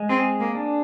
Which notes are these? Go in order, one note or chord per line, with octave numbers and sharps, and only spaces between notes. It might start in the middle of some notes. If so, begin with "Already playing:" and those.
Already playing: G#3
C4 G#4
A#3
D4